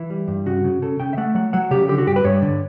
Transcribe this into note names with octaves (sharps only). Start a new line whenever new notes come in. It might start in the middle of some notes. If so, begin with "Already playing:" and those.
Already playing: E3 E4
G3
G2
C#3 F#4
C#3
C#3 A4
C#3 G5
E5
A3 F#5
F#3 F#5
F#3 F#5
C#3 G4
D3 G4
F#4
G2 G4
B4
G2 C#5
D3